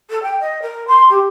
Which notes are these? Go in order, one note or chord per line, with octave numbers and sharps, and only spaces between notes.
A4
G5
D#5
A#4
C6
G4